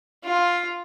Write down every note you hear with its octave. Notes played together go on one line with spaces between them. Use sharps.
F4